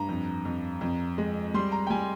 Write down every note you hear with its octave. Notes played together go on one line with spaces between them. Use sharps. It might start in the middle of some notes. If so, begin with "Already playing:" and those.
Already playing: G2 A#5
F2
F2
F2
G#3
G3 C6
A#5
G5
G3 G#5